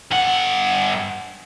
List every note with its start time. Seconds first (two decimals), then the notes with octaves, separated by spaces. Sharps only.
0.11 G2 F#5